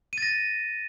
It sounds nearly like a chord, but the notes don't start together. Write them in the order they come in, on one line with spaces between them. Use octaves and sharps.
D#7 A6 A#6